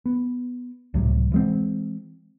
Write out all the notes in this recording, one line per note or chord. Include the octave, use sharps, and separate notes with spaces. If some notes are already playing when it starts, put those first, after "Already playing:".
B3
C#2 A2 C3 F#3
E3 G#3 C4